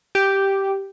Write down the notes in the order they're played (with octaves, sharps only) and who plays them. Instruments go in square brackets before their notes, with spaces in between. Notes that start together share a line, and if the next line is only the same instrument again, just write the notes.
[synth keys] G4